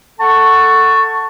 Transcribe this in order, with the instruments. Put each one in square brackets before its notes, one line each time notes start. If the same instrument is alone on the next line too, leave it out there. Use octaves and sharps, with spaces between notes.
[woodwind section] A4 F#5 A5 C#6